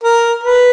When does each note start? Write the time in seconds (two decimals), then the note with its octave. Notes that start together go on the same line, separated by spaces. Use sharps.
0.04 A#4
0.43 B4